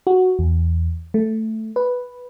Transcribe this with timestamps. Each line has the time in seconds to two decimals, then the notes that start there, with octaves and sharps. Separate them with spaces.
0.07 F#4
0.39 E2
1.14 A3
1.76 B4